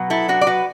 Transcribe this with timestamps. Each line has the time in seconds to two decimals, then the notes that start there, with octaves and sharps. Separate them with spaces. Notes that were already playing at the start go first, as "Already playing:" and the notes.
Already playing: B2 F#3 B3
0.10 E4 A4
0.28 D4 F#4
0.41 D5
0.47 F#4 B4